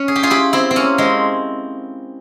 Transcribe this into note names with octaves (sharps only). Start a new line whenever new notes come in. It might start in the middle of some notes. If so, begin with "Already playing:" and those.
Already playing: C#4
G#4
G4
F4 G#4
E4 G4
C4 E4
C4
A#3 C#4
G#3 C4